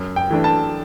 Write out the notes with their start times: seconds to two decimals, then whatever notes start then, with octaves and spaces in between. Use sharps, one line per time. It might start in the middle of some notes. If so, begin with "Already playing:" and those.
Already playing: F#2
0.16 G5
0.31 E3 A3 D4
0.44 A5